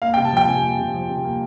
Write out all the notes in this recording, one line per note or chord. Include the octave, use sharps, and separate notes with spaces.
A#3 F5
G5
C3
A5
F3 G5
C3 G#5
A#3
C3
F3
C3
A#3